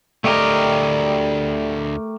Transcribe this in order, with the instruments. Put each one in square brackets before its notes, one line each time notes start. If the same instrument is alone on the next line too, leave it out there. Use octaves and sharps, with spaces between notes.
[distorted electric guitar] D2 D#5 [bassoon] G3 [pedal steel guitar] A3 G4 A#4